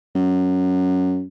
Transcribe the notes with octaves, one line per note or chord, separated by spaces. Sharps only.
F#2